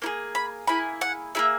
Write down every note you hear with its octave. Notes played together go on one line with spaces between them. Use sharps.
A#3 E4 G#4
B5
A#3 E4 G#4 B5
F#5
A#3 E4 G#4 E5